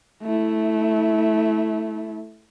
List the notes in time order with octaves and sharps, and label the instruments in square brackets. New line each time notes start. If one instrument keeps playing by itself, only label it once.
[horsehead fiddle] A3 E4